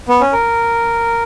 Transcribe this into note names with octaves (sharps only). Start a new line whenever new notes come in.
B3
C#4
A#4